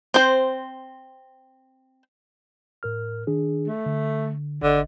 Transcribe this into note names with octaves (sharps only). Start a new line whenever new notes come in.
C4 C5
A2 A#4 F6
D#3 D4 G#4
A3
D3
G#1 D3 D#5